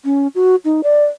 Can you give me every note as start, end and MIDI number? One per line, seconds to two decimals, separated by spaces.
0.05 0.28 61
0.35 0.56 66
0.65 0.81 63
0.83 1.05 74